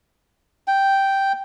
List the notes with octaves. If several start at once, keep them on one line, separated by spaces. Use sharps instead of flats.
G5